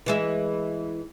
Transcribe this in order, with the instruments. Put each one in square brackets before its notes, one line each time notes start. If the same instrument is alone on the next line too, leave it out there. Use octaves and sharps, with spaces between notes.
[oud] E3 G#3 E4